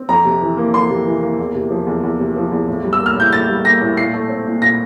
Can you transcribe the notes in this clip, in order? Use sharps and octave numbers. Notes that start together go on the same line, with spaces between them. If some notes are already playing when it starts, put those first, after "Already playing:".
Already playing: C4
F2 A#5
C3
E3
A#3
F2 C6
C3
E3
A#3
E2
C3
F3
E2
E2
C3
F3
E2
A2
G3
E6
A#3
F6
A2 G6
A2 A6
G3
A#3 A#6
A2
A#2 C7
A3
C4
A#2
A#2 A#6